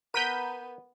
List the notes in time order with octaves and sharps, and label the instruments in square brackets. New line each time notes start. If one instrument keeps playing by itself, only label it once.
[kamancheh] B3 [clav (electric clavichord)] A#4 B4 [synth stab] G6 B6 D#7